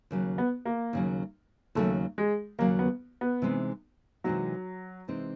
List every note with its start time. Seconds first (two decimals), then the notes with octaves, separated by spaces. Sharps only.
0.11 D#2 C#3 F#3
0.38 B3
0.65 A#3
0.93 D#2 C#3 F#3
1.75 D#2 C#3 F#3 A3
2.18 G#3
2.59 D#2 C#3 F#3 A#3
2.79 B3
3.21 B3
3.42 C3 E3 G#3 C4 D#4
4.24 C3 E3 F#3 G#3 C4 D#4
5.08 C3 E3 G#3 C4 D#4